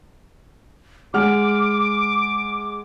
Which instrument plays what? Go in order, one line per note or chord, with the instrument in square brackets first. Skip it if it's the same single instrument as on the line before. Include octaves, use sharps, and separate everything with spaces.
[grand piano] G#3 F#5 F6 [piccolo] D6